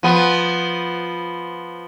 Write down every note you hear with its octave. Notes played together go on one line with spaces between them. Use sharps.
F3 B3